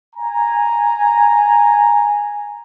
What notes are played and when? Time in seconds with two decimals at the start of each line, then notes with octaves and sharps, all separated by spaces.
0.16 G#5 A#5